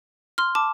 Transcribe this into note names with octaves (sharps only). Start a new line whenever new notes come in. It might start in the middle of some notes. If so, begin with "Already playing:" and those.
C6 F6
A5 D6